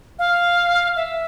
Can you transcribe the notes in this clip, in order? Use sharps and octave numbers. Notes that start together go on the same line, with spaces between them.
F5
E5